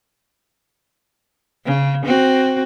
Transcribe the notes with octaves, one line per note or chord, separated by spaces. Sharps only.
C#3
C4 F#4